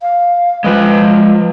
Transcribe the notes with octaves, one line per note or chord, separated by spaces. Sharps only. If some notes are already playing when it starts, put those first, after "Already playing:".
F5
F3 G#3 B4